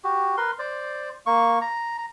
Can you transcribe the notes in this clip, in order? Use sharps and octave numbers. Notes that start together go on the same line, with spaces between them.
F#4 G4
A#4 B4 C6
C5 D5
A#3 C#6
A#5
A#5